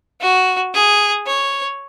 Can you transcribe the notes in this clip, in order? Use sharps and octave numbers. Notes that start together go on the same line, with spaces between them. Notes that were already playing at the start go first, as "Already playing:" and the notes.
F#4
G#4
C#5